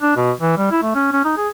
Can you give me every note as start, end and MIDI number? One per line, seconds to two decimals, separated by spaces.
0.02 0.14 62
0.16 0.32 47
0.41 0.54 52
0.58 0.67 55
0.71 0.79 64
0.82 0.93 57
0.95 1.11 61
1.13 1.21 61
1.25 1.33 63
1.37 1.49 68